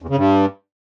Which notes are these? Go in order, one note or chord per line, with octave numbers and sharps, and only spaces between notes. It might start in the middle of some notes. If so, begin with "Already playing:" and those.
E2
C#3
G2